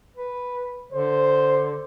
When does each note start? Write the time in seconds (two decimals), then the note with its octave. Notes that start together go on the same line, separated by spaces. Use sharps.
0.17 B4
0.92 D3 C5